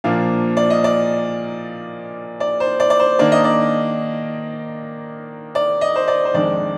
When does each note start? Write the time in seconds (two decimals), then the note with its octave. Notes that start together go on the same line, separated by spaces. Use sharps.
0.04 A#2 F3 A#3 D4 F5
0.57 D5
0.70 D#5
0.84 D5
2.40 D5
2.60 C5
2.80 D5
2.90 D5
3.00 C5
3.19 D#3 A#3 D4 D5
3.32 D#5
3.44 D5
5.55 D5
5.81 D#5
5.96 C5
6.08 D5
6.25 C5
6.34 F2 D#3 G#3 D4 D5